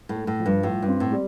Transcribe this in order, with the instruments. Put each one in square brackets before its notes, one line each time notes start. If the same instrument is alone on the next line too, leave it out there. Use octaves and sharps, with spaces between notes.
[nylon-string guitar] A2
[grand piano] A3
[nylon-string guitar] A2
[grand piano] F3
[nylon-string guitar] G2
[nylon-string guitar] A2 [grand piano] F4
[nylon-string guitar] G2
[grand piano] C4
[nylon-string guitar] A2
[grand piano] G3